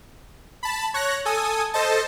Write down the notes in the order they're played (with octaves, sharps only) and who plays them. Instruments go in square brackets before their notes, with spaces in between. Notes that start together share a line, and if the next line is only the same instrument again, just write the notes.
[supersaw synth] A5 B5
C#5 F#6 A#6
A4 G#5 D#6
A4 C5 D#5 A5